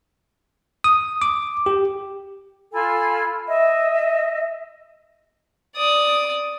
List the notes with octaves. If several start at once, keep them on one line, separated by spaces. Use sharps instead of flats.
D#6
D6
G4
F4 A4 G#5 B5
D#5 E5
D5 D#6